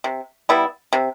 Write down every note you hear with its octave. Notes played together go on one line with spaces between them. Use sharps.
C3
G3 B3 E4
C3